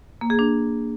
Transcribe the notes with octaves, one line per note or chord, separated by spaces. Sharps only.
A#3
G#4
D4